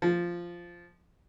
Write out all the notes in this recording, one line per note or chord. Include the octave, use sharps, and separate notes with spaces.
F3